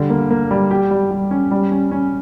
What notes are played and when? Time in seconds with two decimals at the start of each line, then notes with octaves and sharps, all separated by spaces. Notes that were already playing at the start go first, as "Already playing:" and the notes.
Already playing: D3 G3
0.10 A#3
0.31 A#3
0.51 G3
0.71 G4
0.91 G3
1.11 G3
1.31 C#4
1.51 G3
1.71 C#4
1.91 C#4